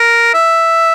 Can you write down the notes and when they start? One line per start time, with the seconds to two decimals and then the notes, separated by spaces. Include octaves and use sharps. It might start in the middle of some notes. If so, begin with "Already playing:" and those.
Already playing: A#4
0.34 E5